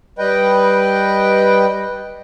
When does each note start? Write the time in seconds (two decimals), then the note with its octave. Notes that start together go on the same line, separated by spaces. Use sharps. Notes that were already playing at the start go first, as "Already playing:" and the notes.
0.19 G3 B4 D#5 G5